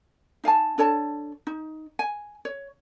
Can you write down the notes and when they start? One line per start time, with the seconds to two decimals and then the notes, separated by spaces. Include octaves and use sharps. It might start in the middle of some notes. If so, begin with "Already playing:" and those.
0.44 D#4 F5 G#5 A5
0.78 D4 A4 C#5 A5
1.47 D#4
1.99 G#5
2.45 C#5